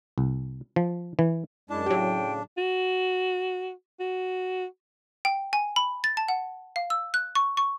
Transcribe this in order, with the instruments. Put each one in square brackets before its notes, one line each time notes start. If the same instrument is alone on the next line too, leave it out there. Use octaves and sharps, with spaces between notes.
[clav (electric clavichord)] C2
F3
E3
[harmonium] F#2 G#3 A5 [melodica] D4 [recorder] E4
[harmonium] A2 C#3 [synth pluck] F#3 G4 [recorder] G5
[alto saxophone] F#4
F#4
[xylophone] G5
G#5
B5
A6
A5
F#5
F5
E6
F#6
C#6
C#6